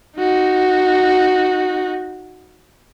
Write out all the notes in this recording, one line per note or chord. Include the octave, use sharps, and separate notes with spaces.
D#4 F#4